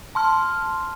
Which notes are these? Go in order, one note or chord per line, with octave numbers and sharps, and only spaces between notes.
A5 C6 F6